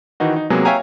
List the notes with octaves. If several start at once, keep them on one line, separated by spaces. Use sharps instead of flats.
D#3 E3 D#4 F#4
D#4
C3 F#3 G#3 A#3 B3 G#4
C#5 E5 F5 G5 G#5 A#5